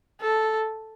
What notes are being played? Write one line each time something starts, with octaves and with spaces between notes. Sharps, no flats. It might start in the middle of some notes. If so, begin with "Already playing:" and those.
A4